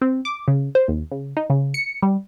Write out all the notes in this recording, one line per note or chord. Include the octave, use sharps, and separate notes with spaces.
C4
D6
C#3
C5
D#2
C#3
D#4
C#3
C#7
G3